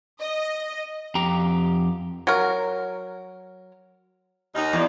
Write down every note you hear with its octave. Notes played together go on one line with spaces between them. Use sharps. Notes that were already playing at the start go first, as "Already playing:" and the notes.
D#5
F2 G4 A#5
F#3 A#4
D#2 D#4
E2